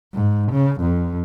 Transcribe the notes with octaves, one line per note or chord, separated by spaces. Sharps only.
G#2
C#3
F2